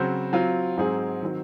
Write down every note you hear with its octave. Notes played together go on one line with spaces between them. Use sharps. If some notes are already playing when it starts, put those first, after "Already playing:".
Already playing: C#3 F#3 C4 F#4 C5
F#3 C4 F4
G#2 F#3 C4 D#4 G#4
D#3 F#3 C4